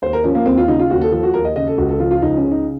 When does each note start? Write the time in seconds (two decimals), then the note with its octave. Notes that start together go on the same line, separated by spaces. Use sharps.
0.02 D#2 C5
0.13 A#4
0.24 F3 C#4
0.35 A#3
0.46 D#2 C4
0.57 F4
0.68 C#3 D#4
0.79 F4
0.90 D#2 F#4
1.01 A4
1.12 F3 A4
1.23 F#4
1.34 D#2 A#4
1.45 D#5
1.56 C#3 D#5
1.67 A4
1.78 C#2 F#4
1.89 A4
2.00 F3 F4
2.11 F4
2.22 C#2 D#4
2.37 C#4
2.44 C#3
2.51 D#4